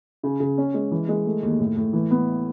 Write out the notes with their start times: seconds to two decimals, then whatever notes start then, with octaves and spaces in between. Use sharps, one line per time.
0.23 C#3
0.40 C#3
0.58 C#4
0.74 G#3
0.91 E3
1.08 G#3
1.26 A3
1.43 D#2
1.60 A2
1.76 A2
1.93 E3
2.11 B3